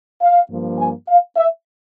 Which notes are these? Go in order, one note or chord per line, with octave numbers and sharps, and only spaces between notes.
F5
G2 F3 A#3
G#5
F5
E5